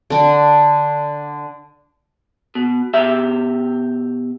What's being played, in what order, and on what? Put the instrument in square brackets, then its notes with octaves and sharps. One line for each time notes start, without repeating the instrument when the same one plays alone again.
[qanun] D3 D4
[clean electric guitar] B2
B2 G4 E5